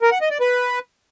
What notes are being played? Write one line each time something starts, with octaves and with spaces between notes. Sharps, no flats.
A#4
F#5
D#5
D5
B4